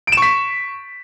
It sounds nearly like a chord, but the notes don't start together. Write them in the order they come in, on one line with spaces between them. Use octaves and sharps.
D7 E7 C#6 B6